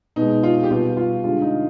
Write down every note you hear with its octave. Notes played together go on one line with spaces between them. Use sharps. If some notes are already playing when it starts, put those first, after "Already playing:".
B2 G#3 D#4
F4
G4
B2 G3 F4
F4
D3 G#3 F4
D#4